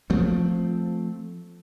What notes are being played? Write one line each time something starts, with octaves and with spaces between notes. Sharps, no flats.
F3 A3 C4